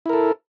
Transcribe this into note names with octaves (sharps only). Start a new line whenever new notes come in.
E4 A4 A#4